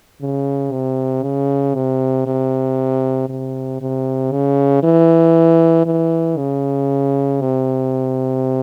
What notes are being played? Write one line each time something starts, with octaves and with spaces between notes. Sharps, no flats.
C#3
C3
C#3
C3
C3
C3
C3
C#3
E3
E3
C#3
C3